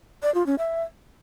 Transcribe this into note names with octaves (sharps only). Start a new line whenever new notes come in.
D5
F4
C#4
E5